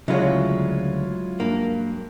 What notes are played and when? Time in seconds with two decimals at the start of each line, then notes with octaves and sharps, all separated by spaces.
0.08 D2 C#3 F#3 G#3 E4 F4 C#5
1.40 G2 A#3